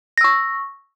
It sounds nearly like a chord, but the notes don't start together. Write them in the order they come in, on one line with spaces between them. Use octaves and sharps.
A#6 E6 C#6